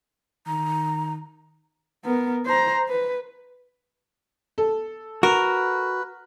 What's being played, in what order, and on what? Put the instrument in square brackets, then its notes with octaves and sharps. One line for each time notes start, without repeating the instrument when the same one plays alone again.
[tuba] D#3 [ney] A#5
[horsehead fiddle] B3 A#4
C5 A#5
B4
[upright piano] A4
[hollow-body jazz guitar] F#4 [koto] A#4 [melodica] B4